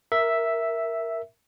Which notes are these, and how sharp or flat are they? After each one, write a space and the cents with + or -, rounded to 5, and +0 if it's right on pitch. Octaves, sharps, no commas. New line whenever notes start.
A#4 +0 E5 +0